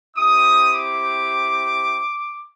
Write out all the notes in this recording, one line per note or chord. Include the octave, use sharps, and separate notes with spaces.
C4 E4 G4 D#6
D6